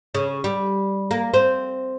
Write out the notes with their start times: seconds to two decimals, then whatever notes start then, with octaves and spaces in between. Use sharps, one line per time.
0.15 C#3
0.44 G3
1.11 A#3
1.34 C4